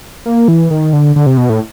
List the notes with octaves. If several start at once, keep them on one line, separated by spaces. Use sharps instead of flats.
A#3
E3
D#3
D3
D3
C3
B2
A2